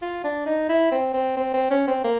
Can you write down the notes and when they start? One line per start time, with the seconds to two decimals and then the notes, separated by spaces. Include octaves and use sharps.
0.02 F4
0.24 D4
0.46 D#4
0.69 E4
0.91 C4
1.14 C4
1.37 C4
1.54 C4
1.70 C#4
1.88 C4
2.04 A#3